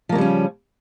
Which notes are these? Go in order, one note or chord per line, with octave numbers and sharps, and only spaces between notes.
C#3 F3 G3 A#3 C#4